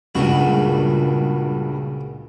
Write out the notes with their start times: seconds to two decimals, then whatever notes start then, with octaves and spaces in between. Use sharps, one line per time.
0.15 C#2 G2 A#2 C#3 F#4